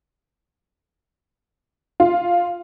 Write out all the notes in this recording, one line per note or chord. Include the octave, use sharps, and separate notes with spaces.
F4